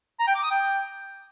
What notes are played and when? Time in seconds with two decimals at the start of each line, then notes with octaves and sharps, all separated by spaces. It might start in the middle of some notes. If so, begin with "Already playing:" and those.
0.20 A#5
0.27 G5
0.35 D6
0.43 D#6
0.51 G5